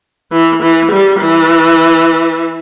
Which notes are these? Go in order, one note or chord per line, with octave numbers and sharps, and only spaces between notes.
E3
E3
G3
E3